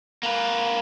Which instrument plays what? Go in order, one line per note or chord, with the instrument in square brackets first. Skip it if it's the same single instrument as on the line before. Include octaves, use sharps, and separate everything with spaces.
[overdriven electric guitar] A#3 B4